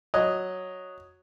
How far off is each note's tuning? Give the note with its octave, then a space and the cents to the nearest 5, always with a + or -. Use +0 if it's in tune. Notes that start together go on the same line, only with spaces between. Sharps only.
F#3 +0 D#5 +0